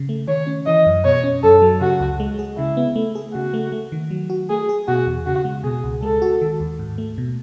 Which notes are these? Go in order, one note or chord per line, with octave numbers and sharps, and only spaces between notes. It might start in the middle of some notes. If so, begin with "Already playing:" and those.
Already playing: C#3
A3
D#3 C#5
C#4
E3 D#5
F#2
B2 C#5
C#4
F#2 A4
F#3
C#3 F#4
C#2
G#3
G#4
C#3 E4
B3
A3
G#4
C#3 F#4
A3
A3
D#3
F#3
F#4
A3 G#4
G#4
B2 F#4
E2
C#3 F#4
G#3
B2 G#4
C#2
G#3 A4
F#4
D#3
D#2
G#2
A3
B2